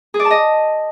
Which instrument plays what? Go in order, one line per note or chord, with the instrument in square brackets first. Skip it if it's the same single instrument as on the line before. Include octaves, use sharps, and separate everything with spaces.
[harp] G#4
D5
A5
D#5